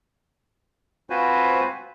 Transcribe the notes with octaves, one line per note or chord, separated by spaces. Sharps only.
C4 F4 F#4 B4 C5 G#5